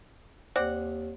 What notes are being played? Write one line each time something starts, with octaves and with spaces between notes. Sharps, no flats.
D#2 C4 D5 F#5